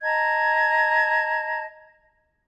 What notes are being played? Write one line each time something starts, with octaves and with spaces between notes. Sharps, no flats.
D#5 A5 A#5 G#6